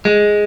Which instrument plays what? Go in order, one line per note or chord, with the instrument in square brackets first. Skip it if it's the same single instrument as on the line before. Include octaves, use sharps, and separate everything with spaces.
[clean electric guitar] G#3